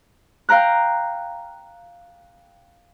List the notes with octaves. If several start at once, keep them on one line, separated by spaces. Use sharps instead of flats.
F5 G5 A#5 F#6